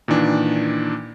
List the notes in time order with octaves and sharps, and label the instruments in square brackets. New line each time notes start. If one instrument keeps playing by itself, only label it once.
[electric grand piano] A#2 D#3 E3 D4